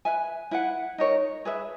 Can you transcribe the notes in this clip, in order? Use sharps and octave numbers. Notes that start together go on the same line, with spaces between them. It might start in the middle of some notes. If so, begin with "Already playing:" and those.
B4 E5 G#5
E4 B4 F#5
D#4 A#4 C#5
G#4 B4 E5